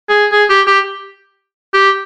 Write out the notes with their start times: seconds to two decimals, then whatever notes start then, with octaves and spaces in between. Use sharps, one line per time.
0.09 G#4
0.32 G#4
0.49 G4
0.67 G4
1.74 G4